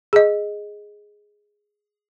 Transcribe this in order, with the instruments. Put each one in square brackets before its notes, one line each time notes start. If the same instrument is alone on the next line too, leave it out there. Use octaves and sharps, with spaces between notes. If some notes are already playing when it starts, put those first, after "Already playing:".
[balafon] G#4 D#5